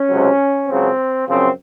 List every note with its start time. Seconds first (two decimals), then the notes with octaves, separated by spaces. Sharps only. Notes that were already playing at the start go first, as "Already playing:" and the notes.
Already playing: C#4
0.09 C#2 C3 F#3 C4
0.68 C#2 C#3 F#3 C4
1.28 F#2 C#3 F3 C4